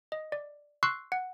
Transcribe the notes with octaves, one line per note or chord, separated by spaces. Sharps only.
D#5
D5
C6 C#6 E6 F#6 C7
F#5